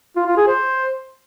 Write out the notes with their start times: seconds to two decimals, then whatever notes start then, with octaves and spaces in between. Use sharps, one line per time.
0.16 F4
0.27 F4
0.37 G#4
0.47 C5